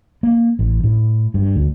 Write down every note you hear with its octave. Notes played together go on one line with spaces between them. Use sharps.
A#3
A1
A2
G2
D2